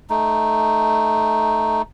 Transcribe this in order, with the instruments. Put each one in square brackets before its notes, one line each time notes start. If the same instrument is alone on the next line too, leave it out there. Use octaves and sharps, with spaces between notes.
[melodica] A3 D#4